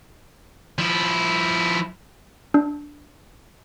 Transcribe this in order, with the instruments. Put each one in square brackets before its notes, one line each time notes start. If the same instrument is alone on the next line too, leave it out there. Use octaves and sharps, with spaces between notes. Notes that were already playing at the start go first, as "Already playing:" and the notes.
[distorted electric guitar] F3 E4
[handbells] D4